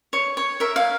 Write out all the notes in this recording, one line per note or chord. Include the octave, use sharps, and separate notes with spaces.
C#5
C#5
A#4 E5
F5